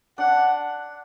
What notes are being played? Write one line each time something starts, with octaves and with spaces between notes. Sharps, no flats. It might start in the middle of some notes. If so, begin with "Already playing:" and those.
D4 F#5